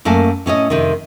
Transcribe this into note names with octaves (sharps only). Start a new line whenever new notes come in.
F#2 A3 A#3 G#5 A5
A2 C#4 C#5 D#5
F2 C3 D#3